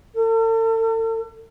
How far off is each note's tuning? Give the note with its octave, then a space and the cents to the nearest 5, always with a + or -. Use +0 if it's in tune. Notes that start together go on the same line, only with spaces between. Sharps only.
A4 +40